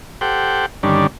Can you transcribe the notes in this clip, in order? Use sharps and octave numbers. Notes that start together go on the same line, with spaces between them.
G4 A4 C5 F#5 G5
G2 D3 D#3 G3 C#4 D4